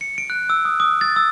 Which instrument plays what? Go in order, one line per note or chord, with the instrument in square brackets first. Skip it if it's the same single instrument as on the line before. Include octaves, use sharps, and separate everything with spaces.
[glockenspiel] C#7
D7
F#6
E6
D#6
D#6
A6
E6